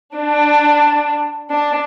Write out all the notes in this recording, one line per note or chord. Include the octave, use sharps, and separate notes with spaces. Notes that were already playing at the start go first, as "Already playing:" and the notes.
D4
D4